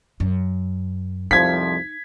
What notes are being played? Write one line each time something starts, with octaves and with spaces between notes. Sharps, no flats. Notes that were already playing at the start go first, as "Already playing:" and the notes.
F#2
C2 F2 F3 D#4 G#6 B6